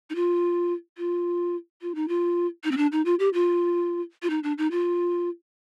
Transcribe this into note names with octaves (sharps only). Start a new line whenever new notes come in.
D#4
F4
F4
F4
D#4
F4
D#4
C4
D4
D#4
F4
G4
F4
F4
D#4
D4
D#4
F4